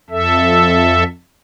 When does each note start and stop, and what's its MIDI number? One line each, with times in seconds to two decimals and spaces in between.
0.10 1.04 41
0.10 1.04 69
0.10 1.04 76